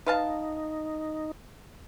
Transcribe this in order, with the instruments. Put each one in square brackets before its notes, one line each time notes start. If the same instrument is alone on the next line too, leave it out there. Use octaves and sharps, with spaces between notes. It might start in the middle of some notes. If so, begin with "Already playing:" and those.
[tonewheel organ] D#4 [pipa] B4 F5 A5